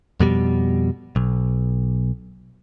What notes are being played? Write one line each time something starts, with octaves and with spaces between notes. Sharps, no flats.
F2 B2 G3
B1